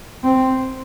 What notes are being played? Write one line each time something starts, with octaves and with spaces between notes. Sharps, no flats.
C4